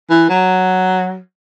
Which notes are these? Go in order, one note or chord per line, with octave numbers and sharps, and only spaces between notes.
E3
F#3